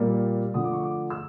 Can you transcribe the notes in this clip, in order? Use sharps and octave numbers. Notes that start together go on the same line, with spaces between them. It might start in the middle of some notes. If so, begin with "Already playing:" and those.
Already playing: A#2 G3 A#3
D3 F3 A3 D#6
D6
C#6
D6
E6